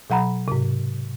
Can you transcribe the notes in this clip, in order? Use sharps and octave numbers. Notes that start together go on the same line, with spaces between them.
B2 F#3 F#5 A#5 B5
G#2 C3